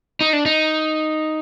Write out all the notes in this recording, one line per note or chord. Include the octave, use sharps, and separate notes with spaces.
D#4
D4
D#4